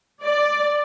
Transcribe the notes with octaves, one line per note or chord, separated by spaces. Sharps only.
D5